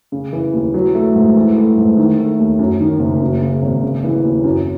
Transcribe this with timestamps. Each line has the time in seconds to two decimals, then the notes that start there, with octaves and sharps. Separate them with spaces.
0.12 C#3
0.33 E3
0.53 D#2
0.74 F#3
0.95 A3
1.15 G#2
1.36 E3
1.57 A3
1.77 G#2
1.98 D#3
2.18 A3
2.39 D#2
2.59 F#2
2.80 D#3
3.00 F#1
3.21 F#2
3.42 C#3
3.62 G#1
3.83 C#3
4.04 E3
4.24 D#2
4.44 F#2